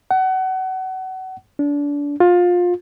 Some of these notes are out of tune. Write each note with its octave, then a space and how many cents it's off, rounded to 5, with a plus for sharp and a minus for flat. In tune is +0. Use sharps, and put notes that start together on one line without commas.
F#5 +30
D4 -30
F4 +20